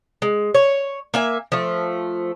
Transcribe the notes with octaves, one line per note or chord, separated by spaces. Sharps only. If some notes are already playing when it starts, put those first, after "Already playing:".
G#3
C#5
A#3 E5 G#5
F3 A3